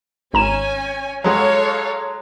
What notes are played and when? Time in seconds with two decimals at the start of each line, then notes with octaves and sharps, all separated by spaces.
0.34 G#1 C#4 G#5 A#5 E7
1.24 F#3 G#3 A4 C#5 F5 F#5